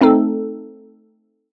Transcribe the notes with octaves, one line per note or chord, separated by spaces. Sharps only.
A3 C4 D#4 A4